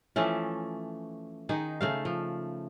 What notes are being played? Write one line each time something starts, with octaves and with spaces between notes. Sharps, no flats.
E3 F3 A3 C#4
D#3 D#4 G#4
C#3 A3 F5
F3